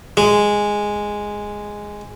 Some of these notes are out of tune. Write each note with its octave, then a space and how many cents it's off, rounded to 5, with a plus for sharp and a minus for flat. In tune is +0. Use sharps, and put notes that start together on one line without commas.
G#3 -5